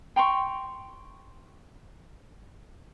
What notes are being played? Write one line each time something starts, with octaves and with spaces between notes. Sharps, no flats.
G5 A#5 C6 C#6